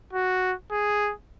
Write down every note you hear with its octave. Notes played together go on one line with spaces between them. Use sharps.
F#4
G#4